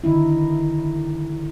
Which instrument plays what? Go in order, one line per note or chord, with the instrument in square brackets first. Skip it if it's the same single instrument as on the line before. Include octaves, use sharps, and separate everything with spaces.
[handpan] D3 D#3 D#4 E4